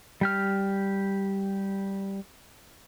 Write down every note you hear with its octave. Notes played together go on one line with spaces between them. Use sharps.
G3 G4 F6